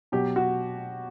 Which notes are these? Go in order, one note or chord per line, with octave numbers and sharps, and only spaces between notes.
B2 F#3 G4
F#4